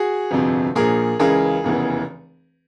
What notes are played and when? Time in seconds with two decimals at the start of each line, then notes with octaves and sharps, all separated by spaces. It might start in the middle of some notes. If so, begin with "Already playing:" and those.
Already playing: F#4 G#4
0.31 G1 F2 C3
0.75 A#1 A#2 G#4 A#4
1.20 C#2 C#3 E3 G#4 A#4
1.64 F1 E2 C#3 E3